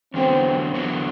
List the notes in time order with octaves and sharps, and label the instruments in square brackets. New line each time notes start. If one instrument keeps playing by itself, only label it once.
[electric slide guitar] E2 D3 F#3 B3 [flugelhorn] C4
[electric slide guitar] E2 D3 F#3 B3